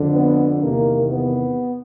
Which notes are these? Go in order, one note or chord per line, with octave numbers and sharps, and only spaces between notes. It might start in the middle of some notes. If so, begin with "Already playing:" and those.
Already playing: F2 D3
B3
E2 C3 D#3 A#3
B3